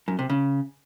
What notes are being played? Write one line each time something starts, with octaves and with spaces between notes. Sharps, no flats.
F#2
C3
C#3